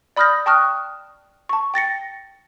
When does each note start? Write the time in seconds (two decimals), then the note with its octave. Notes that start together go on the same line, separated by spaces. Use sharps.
0.17 D5 B5 D#6 F6 G6 A#6
0.46 G5 A5 C#6 D#6 F6 F#6
1.49 A5 C#6
1.74 G5 A6 A#6 C#7